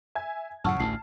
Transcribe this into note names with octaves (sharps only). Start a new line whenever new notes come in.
E5 G#5 G#6
F#2 A2 C#3 F#5 A5 C#6 E6 F6
A1 D2 C7